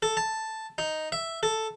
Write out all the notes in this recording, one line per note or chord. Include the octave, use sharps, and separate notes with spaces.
A4
A5
D#4
E5
A4